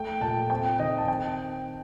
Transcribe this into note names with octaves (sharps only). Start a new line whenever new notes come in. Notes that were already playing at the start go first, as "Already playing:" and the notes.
Already playing: A3 G5
A#2 A5
C4 G5
D#3 D#5
A5
C4 G5